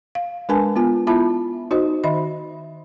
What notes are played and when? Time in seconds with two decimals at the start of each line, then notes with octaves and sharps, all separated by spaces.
0.15 F5
0.49 G#3 D4 A#4 B4 G#5 A5
0.76 B3 F4 G#5
1.07 B3 E4 F4 E5 A5 B5
1.71 D#4 F#4 C5 D#5
2.04 D#3 D#5 E5 B5